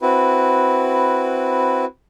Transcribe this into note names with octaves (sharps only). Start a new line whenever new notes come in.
C4 E4 F#4 B4